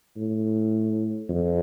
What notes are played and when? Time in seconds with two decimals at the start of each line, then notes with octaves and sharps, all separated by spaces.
0.17 A2
1.30 F2